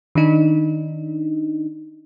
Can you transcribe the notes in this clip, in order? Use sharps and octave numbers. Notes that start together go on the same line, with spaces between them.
D#3 D4 D#4